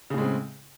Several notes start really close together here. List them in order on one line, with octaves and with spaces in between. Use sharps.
C#3 A2 G#3 C4